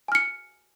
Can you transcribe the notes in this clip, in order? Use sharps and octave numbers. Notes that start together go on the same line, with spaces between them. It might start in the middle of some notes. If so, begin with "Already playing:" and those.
G#5 F6 C#7